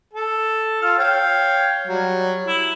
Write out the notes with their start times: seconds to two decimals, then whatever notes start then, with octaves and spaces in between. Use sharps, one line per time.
0.13 A4
0.81 F4 A4 F6
0.98 C#5 F5 G5
1.87 F#3 G3
2.47 E4